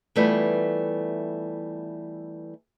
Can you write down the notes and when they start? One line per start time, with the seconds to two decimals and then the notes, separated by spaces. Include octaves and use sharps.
0.16 E3 G3 A3 B3 E4 F4